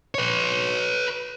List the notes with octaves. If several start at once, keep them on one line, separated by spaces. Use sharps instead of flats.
B4 C#5